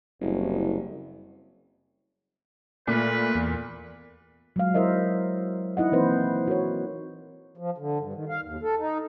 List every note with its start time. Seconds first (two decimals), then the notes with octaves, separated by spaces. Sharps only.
0.21 F#1 C2
2.88 A#2 A3 B4
3.35 E2
4.56 F#3 G#3 F5
4.74 E4 A#4 C5 D#5 E5
5.77 D#4 E4 D#5 F#5
5.92 E3 A#3 C4 B4 C5
6.48 F#4 A#4 C#5
7.57 F3
7.78 D3
7.99 G2
8.13 D#3
8.29 F5
8.44 D#2
8.63 A4
8.79 D#4